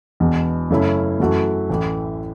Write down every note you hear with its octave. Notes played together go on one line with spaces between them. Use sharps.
E1 E2 B2
F#2 C#3 A3 C#4 E4
F#2 E3 A3 F#4
A1 A2 E3